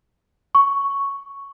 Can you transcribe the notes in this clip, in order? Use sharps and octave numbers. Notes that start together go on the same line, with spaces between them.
C#6